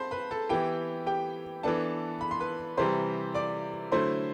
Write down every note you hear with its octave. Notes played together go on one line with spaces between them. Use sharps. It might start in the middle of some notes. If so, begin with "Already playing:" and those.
Already playing: C4 C5 A5 B5 C6
B4 B5
A4 A5
E3 B3 E4 G4 G5
G4 G5
E3 B3 D4 A4 A5
B5
C6
B4 B5
C3 E3 G3 C5 C6
D5 D6
D3 F#3 A3 E4 C5 C6